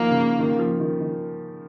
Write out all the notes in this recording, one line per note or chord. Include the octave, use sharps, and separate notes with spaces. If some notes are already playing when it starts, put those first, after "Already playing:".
Already playing: D#3 F3 A#3
C#3
D#3
F3
D#3
D#3